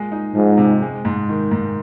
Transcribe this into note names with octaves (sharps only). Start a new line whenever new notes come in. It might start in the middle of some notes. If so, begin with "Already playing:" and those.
Already playing: A#2 G#3
D#4
G#2 F3
C3
G#3
G#2
D#3
G#2